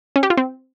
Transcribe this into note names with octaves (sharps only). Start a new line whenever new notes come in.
C#4
G4
F4
C4